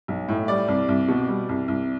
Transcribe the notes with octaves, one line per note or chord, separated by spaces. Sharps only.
B1
A2
G3 D5
C2
C2
B2
G3
C2
C2